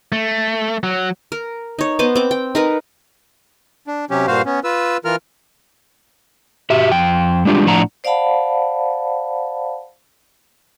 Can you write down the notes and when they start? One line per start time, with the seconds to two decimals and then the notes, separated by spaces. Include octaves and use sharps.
0.12 A3
0.83 F#3
1.32 A#4
1.79 D#4 C#5
1.99 B3 C5 D#5 D6
2.16 C4 D6
2.31 G5
2.55 D#4 A#4 B4
3.87 D4
4.10 C3 F#3 C#4 G4
4.27 G2 A#2 F#4 C5 F5
4.45 B3 C#4
4.64 F4 B4 E6
5.05 E3 F4 A#4 F6
6.70 F#4 G4 E5
6.92 F2 G5
7.45 G3 G#3 D4 F4 G4
7.66 A2 F3 D4 F#5 A#5
8.04 C5 D5 F5 F#5 A5 B5